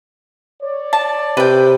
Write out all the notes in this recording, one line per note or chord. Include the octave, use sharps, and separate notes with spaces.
C#5 D5
A5
C3 B4 G5